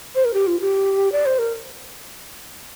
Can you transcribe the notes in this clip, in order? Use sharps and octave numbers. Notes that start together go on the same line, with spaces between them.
C5
A#4
G4
F4
G4
D5
C5
A#4